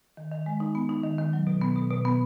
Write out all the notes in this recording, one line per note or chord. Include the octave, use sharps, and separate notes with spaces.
D#3
D#3
G#3
D#4
B3
D#4
D#3
D#3
F#3
B2
B3
B2
B2
B3